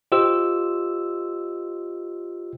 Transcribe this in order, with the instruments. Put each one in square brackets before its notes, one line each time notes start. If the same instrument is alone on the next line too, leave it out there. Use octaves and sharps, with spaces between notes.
[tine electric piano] F4 G4 C5 D#5 E6